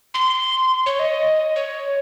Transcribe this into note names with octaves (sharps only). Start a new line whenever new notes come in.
C6
C#5
D#5
C#5